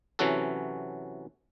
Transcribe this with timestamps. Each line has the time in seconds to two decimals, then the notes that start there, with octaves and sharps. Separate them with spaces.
0.19 C3 E3 F#3 C#4 F#4 A4